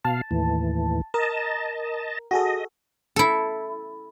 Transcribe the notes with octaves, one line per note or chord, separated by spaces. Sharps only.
B2 F5 A5
D#2 A2 E3
A#4 D#5 A5
F#4 G#4 A4 D#5
E4 A4